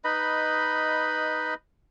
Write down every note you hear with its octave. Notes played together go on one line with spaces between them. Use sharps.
D#4 B4 D#5 B5